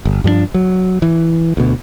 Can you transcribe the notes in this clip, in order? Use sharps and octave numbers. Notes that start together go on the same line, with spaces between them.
G1
G2 F3 B3 D4
F#3
E3
D2 B2